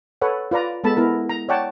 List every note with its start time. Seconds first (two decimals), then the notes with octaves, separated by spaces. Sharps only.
0.22 A4 B4 C#5 F#5
0.51 F4 B4 D5 A#5
0.84 G#3 B3 A4 A5 B5
0.97 B3 E4 A#4
1.29 A#5
1.49 C#5 D5 F#5 G5 A5